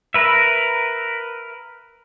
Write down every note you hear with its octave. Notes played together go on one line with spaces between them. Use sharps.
A#4 B4 E5